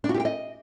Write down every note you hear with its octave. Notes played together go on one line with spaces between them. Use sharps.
D4
F#4
G4
G5
D#5